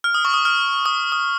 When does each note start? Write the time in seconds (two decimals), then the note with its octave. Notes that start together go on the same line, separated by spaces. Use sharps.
0.04 F6
0.14 D#6
0.25 C#6
0.34 D#6
0.45 F6
0.86 D#6
1.12 D#6